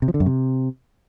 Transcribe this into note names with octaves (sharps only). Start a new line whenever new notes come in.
C3
F3
D3
F#2
C3